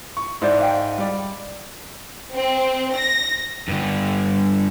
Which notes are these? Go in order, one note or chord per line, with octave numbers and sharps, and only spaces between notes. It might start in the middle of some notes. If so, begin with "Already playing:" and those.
C#6
G#2 E4 C5 D5
F5 G5
G3 D5
C4
A#6
G2 D3